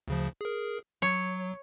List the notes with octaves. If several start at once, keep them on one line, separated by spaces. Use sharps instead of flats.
D2 C#3 F3
G#4 A#4
F#3 C#5